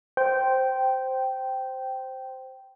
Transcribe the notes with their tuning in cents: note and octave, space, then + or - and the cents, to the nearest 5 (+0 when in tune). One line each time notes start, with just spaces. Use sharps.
C5 +0 G5 -10